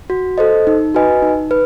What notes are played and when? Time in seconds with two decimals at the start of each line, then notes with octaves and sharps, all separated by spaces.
0.10 F#4
0.38 A4 C5 D#5
0.67 D#4
0.94 F#4 B4 D#5 G#5
1.22 D#4
1.51 B4